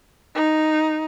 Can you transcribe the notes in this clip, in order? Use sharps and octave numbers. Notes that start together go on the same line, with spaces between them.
D#4